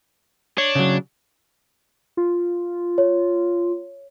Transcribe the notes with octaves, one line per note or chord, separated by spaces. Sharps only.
D4 C#5
C#3 F#3
F4
C#5